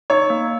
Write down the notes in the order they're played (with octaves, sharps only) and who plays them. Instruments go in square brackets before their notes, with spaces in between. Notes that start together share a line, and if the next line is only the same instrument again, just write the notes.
[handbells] D#4 [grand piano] C#5
[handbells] A#3